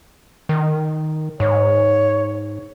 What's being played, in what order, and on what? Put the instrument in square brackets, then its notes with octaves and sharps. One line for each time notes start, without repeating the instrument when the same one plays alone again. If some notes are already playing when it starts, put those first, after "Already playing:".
[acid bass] D#3
[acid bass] G#2 [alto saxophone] C#5